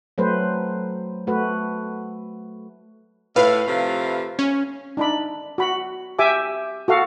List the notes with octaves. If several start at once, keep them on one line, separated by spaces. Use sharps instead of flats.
F#3 A3 B4 C5
A3 F#4 B4
A2 B4 F5
C3 F3 A3
C#4
D4 D#4 B5
F#4 B5
G4 E5 G#5 D6
F#4 A4 F5